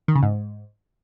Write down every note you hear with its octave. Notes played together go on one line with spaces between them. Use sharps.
D#3
C#3
G#2